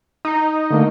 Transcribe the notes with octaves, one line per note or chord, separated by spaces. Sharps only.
D#4
D3 A3 A#3